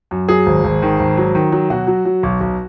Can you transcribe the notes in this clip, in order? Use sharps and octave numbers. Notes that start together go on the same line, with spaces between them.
F#2
F#3 G#4
G#1
G#1
D#3
G#1
F#3
D#3
F#3
B2 F#4
F#3
F#3
B1
B1